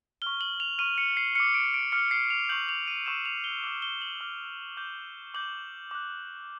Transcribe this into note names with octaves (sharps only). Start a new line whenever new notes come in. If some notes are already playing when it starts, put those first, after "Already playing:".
C#6 F6 G7
F#7
F7
C#6 F6 D#7
C#7
C7
D6 F6 C#7
D7
D7
D6 F6 C#7
C7
F7
C#6 E6 G6 F#7
F7
D#7
C#6 E6 G6 E7
F7
G7
D6 F6 F#7
G7
F#7
D6 F6
D6 G6
D6 G6 F#7
D6 F#6